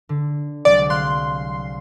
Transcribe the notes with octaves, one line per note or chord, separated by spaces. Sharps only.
D3
C2 F#3 G#3 D5
F5 C6 F#6